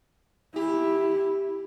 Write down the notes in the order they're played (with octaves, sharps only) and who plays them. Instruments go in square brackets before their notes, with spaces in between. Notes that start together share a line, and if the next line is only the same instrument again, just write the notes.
[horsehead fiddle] E4 [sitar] G4